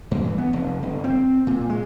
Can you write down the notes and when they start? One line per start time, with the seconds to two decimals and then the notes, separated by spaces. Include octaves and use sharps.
0.11 G2
0.24 E3
0.38 B3
0.53 F1
0.83 G1
1.04 C4
1.47 A#2
1.69 G#3